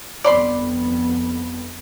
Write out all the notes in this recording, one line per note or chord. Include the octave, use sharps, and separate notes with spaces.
G1 F2 B3 D5 B5 C6